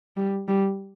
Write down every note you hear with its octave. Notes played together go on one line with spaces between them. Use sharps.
G3
G3